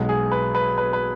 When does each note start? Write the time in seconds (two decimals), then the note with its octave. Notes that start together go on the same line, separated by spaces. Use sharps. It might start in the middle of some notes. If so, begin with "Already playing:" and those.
Already playing: B1 B2 G#3
0.09 G#4
0.31 B4
0.55 B4
0.78 B4
0.93 B4